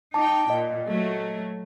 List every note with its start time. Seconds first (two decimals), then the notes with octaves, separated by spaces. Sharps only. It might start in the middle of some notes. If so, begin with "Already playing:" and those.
0.14 D#4 G5 A5 D6
0.50 A#2 D#5
0.87 F#3 A3